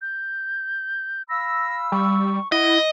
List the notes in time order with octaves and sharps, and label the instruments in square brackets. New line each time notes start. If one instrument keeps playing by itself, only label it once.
[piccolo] G6
[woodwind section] F5 B5 E6 [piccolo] A#6
[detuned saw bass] G3 [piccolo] C#6
[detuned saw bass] E4 [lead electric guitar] D#5 [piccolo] F#5